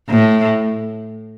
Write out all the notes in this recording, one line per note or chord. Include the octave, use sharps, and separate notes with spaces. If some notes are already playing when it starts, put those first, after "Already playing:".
A2